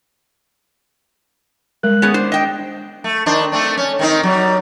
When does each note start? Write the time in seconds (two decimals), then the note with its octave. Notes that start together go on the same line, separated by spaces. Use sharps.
1.83 G3 G#3 A#4 F#6
2.02 B3 C#4 G#4
2.14 D4 C5
2.32 D#5 G5
3.04 A3
3.26 D#3 D4 C5
3.52 A3 C4 D4
3.77 C#4
3.99 D#3 C4 D#4
4.23 F#3 G3